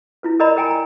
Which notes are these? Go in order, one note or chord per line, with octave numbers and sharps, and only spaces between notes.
E4 F4 B4
A#4 D5 D#5 A#5 B5
A#4 G5 G#5 A#5
A#5